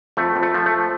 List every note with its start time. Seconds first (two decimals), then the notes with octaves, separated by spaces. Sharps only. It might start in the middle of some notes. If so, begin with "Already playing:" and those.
0.17 F2 A3
0.36 F2
0.43 A3
0.54 F3
0.66 A3